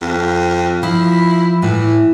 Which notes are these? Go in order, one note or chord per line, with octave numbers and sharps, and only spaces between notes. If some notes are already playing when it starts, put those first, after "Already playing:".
F2
F3 E4
A2 E3